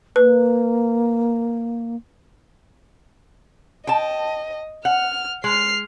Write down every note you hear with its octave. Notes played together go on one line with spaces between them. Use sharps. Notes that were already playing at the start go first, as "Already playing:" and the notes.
A#3 B4
D#5 G5 A5
F#5 F6
G#3 F6 C7